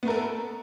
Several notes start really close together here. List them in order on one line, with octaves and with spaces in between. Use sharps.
B3 A3 A#4 A4